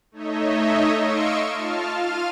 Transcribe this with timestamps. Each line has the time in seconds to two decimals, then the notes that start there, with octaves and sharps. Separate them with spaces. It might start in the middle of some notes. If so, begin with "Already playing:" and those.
0.12 A3 D#4 C#5 D#5 E5
0.96 D#5 F5 C6 C#6 E6 D7
1.51 F4 A5 F6
1.94 F4 F5 F6 D#7